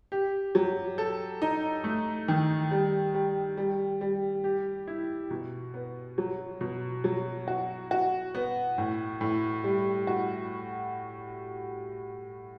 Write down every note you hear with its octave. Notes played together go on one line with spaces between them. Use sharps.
G4
F#3
A4
D#4
A3
D#3
G3
G3
G3
G3
G4
E4
B2
B3
F#3
B2
F#3
F#4
F#4
B3
A2
A2
G3
F#4